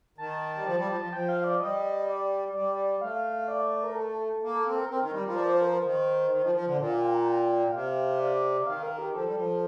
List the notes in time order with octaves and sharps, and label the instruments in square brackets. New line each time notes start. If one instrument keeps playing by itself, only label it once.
[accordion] D#3 [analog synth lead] A5
[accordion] G3
F3
G3
F3
F3
[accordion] F3 [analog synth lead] G5
[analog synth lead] F5
D5
[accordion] G3 [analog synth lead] D#5
[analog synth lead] D5
[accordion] G3 [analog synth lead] D5
[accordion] A3 [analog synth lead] F5
[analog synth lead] D5
A#4
A4
[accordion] A#3
[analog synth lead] A4
[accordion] C4 [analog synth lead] A4
[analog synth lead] A#4
[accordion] C4 [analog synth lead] A#4
[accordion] D#3
G3
F3
[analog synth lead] D5
C5
A#4
C5
[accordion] D#3
D#3
F3
F3
D3
[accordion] A#2 [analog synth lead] D5
[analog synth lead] F5
G5
A#5
G5
[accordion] C3 [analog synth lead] F5
[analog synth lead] D5
[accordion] D#3 [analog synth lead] F5
[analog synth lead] A#4
G4
[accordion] F3 [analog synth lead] A4
[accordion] G3
F3